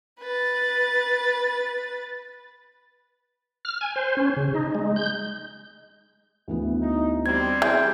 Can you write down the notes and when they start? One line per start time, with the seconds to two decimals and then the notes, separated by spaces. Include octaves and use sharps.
0.20 B4 A6
3.65 F6
3.81 G#5
3.96 C5
4.17 C#4
4.37 C#3
4.54 D#4
4.75 G#3
4.96 G6
6.48 D2 E3 B3
6.80 D#4
7.26 G3 C4 G#6
7.62 E3 G#4 G6